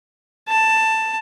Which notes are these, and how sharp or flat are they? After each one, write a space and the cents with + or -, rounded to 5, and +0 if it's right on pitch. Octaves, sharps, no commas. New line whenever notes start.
A5 +10